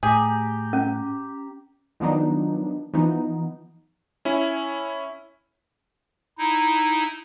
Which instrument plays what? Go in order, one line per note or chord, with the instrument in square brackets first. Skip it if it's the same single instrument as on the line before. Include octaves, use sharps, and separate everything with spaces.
[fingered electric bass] A2 [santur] G4 A#5 [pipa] G#4
[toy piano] C#4
[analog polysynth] D#3 F3 F#3 B3 D4 D#4
E3 F3 B3 D#4
[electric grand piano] C#4 E4
[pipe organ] D#4 E4